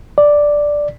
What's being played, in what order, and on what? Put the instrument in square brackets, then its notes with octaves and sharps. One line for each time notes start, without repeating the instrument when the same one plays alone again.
[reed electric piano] D5